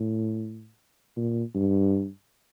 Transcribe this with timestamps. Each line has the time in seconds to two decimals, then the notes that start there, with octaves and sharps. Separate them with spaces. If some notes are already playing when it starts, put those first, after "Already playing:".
Already playing: A2
1.16 A#2
1.54 G2